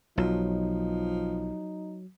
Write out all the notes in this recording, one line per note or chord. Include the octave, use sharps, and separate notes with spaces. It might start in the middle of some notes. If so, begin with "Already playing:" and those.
B1 F3 F#3 D#4